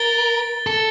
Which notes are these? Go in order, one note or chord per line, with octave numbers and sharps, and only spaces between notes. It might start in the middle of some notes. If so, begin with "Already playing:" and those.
Already playing: A#4 A6 G7
A4